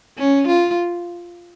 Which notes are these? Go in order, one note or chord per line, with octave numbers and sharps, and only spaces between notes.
C#4
F4